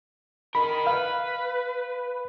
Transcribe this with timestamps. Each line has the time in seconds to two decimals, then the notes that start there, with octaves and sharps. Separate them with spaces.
0.55 D#4 A#4 B5
0.87 B4 F5